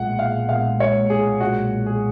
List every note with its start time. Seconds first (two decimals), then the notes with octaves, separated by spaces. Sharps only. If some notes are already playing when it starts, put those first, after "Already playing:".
Already playing: B1 A#2 G#3 F#5
0.19 F5
0.49 B1 A#2 G#3 F5
0.80 C#5
1.10 G#4
1.40 B1 A#2 G#3 F#4
1.86 G#4